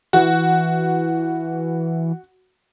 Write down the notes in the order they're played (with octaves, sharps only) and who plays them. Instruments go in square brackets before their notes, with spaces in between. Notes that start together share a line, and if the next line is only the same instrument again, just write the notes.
[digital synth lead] E3 [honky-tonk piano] F#4